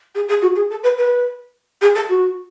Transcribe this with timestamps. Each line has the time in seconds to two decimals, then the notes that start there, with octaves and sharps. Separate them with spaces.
0.15 G#4
0.28 G#4
0.42 F#4
0.55 G#4
0.70 A4
0.83 B4
0.97 B4
1.81 G#4
1.95 A4
2.09 F#4